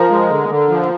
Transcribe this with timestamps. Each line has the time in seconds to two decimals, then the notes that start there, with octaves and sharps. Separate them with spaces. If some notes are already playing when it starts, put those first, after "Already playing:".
Already playing: F3 A#4 A#5
0.10 G#3
0.30 D3
0.49 D3
0.69 F3